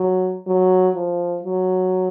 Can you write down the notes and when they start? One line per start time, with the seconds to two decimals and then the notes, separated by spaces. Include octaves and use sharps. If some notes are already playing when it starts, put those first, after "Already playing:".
Already playing: F#3
0.47 F#3
0.95 F3
1.43 F#3